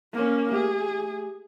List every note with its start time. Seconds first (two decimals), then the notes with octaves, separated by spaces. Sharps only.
0.13 A#3 C#4
0.52 A3 G4 G#4